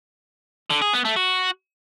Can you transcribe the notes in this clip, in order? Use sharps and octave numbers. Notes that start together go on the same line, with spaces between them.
D3
G#4
B3
A3
F#4